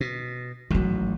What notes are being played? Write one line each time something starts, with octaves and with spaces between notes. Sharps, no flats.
B2
A1 G#2 D#3 F#3